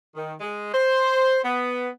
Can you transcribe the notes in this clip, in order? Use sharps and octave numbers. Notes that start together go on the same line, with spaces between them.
D#3
G#3
C5
B3